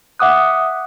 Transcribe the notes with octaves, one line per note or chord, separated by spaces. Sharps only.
E5 F#5 D6 D#6 F#6